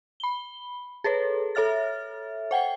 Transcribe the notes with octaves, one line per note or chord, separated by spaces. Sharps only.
B5 G7
G#4 A4 B4 C#5
A4 C#5 E5 F6 A6
C5 F#5 G5 C7